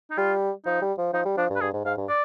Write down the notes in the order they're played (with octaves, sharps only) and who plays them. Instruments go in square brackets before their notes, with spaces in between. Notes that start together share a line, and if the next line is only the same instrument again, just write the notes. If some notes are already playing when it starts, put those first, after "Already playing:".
[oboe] D#4
[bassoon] G3 [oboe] F4
[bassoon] F3 [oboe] D#4
[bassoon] G3
F3
[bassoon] F3 [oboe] D#4
[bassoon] G3
[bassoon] F3 [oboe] D4
[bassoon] G2
[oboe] B4
[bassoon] G2 [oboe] G#4
[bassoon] G#2
[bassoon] G#2 [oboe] F5
[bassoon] G2
[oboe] D5